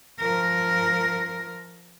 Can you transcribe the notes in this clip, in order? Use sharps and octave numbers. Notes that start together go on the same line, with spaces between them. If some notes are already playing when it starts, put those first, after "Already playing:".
F3 A#4